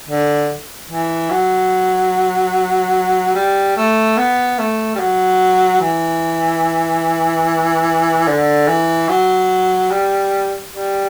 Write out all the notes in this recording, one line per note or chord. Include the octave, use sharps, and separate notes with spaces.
D3
E3
F#3
G3
A3
B3
A3
G3
F#3
E3
D3
E3
F#3
G3
G3